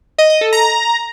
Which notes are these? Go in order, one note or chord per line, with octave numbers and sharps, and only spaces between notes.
D#5
D#5
A4
A#5